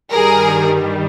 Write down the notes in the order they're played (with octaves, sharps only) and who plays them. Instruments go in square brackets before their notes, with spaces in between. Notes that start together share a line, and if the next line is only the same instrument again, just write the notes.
[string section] G2 D#3 G3 G#4 A#4